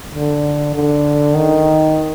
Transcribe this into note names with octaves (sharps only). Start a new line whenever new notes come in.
D3
D3
D#3